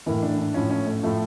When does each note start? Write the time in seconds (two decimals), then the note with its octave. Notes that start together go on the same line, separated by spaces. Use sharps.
0.06 A2 E3 A#3
0.22 D4
0.39 D4
0.54 A2 F3 C#4
0.71 C#4
0.87 A3
1.03 A2 F3 A3